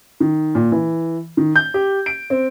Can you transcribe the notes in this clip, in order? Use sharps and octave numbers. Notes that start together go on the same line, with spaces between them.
D#3
A#2
E3
D#3
G6
G4
D7
C4